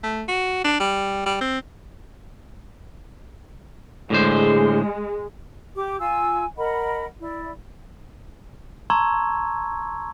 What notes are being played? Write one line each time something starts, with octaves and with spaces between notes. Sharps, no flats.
A3
F#4
D4
G3
G3
C4
A2 D3 G#3 C5
G4 D6
F4 G#5 E6
A#4 D#5 F#5 B5
E4 D5
A5 A#5 C6 C#6 E6 G#6